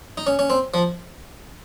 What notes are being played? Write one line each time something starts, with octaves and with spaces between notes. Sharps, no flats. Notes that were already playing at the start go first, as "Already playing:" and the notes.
D#4
C#4
C#4
C4
F3